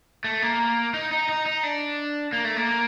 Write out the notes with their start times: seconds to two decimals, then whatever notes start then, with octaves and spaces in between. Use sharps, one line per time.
0.24 A3
0.42 A#3
0.94 D#4
1.11 D#4
1.29 D#4
1.46 D#4
1.63 D4
2.33 A#3
2.45 A3
2.56 A#3